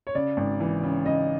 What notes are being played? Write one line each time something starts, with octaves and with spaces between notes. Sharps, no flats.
C#5
C#3 D5
G#1
E3
C#3
C#3 D#5